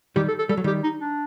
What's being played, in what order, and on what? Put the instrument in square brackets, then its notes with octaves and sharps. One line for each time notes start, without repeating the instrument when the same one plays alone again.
[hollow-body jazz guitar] D#3 G3 [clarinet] G4
[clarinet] A4
A4
[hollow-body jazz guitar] G3 [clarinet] A4
[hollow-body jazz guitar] F#3
[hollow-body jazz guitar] D#3 G3 [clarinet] G4
[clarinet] D#4
D4